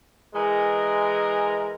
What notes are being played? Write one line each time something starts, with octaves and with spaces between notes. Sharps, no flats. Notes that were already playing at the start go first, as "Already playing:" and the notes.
E3 G#3 A#4